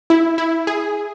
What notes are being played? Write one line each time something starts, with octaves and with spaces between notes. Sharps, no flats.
E4
E4
G#4